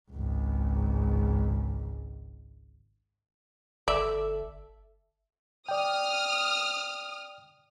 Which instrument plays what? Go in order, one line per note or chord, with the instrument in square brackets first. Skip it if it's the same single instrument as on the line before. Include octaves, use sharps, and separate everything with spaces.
[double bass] G#1 C#2
[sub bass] G1 [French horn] A4 [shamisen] D5 [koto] E5
[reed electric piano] D5 G5 [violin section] D#6 F6